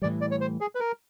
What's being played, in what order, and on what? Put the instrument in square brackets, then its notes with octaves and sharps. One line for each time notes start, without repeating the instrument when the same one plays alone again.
[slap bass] A2 E3 G3 [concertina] D5
[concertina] D5
C#5
C5
G#4
B4
A#4